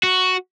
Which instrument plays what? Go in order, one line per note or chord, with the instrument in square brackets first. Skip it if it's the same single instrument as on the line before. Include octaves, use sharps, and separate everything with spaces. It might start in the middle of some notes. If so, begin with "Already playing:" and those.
[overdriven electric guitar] F#4